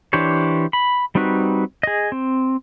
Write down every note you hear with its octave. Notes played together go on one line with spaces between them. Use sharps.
E3 D4 G4 C5 C#5
B5
G3 C4 D#4 F#4 B4
G#4 D#5
C4